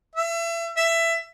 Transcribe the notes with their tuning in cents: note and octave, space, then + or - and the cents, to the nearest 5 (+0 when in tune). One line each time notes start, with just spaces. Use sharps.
E5 +30
E5 +15